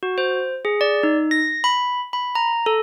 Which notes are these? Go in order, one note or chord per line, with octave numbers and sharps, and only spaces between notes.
F#4
C5
G#4
D5
D#4
A#6
B5
B5
A#5
A4